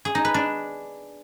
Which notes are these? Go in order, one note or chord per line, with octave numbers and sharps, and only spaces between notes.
G#4
D#4
B4
D4